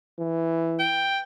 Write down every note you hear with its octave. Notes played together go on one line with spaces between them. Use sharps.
E3
G5